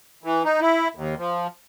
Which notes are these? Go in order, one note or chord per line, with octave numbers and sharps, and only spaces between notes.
E3
D#4
E4
D#2
F3